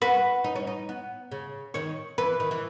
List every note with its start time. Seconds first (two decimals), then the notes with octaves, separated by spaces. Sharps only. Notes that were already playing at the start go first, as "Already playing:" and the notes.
0.01 F#4 B4
0.44 D#4
0.55 C#4
0.67 D#4
0.89 B3
1.32 C#3
1.74 D#3 C#5
2.18 E3 B4
2.40 D#3
2.51 E3